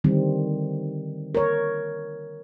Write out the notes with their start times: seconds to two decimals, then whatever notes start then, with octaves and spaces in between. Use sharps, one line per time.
0.04 D3 D#3 G3 C4
1.35 A#4 C#5